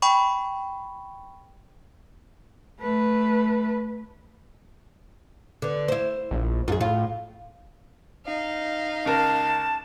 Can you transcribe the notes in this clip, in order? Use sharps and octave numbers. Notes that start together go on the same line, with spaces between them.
G5 B5 C#6
A3 B4
D3 B3
E4 C5
A#1
F#2 F4 G#4
A2 F4
D#4 F5
C#2 A#4 A5